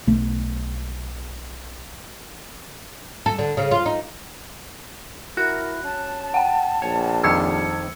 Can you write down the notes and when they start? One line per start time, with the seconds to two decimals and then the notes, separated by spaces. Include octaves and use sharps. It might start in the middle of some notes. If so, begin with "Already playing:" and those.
0.07 B1 A3
3.26 A4
3.39 D3
3.57 C#3
3.71 F4
3.86 D#4
5.37 E4 F#4 A#4 F#6
5.84 C#4 A5
6.34 F#5 G5
6.82 A#1 C#5
7.24 F2 D#3 G3 E6 G#6 C#7